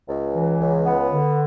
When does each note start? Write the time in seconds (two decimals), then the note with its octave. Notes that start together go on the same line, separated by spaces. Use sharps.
0.09 C#2
0.34 E3
0.59 C#2
0.86 B3
1.11 D3